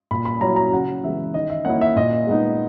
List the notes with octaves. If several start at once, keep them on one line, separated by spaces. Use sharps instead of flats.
A#2 B5
B5
F#3 C#4 E4 A#5
A#5
C#3 F#5
E3 G#3 B3 E4 E5
D#3 D#5
E5
A#3 C#4 E4 F#5
E5
A#2 D#5
G#3 B3 D#4